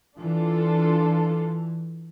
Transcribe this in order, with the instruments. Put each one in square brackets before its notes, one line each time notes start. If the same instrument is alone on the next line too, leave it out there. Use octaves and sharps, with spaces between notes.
[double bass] E3 [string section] D4 F4 A4